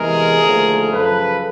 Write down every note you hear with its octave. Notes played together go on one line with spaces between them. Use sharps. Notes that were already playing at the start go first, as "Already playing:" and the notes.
Already playing: E2 C3 E3 G#3 G#4 A#4
D#2 D3 F3 A3
F#2 C#3 F3 A4 B4